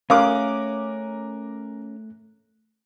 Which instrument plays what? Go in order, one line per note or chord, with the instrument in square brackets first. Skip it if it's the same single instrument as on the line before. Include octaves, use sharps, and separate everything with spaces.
[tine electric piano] A3 F#6 [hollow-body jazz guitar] C#4 [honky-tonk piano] A#4 D6 [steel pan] F5